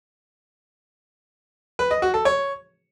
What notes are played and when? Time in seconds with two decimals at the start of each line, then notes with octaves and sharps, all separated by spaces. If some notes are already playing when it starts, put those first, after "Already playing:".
1.79 B4
1.91 D#5
2.02 F#4
2.14 A4
2.25 C#5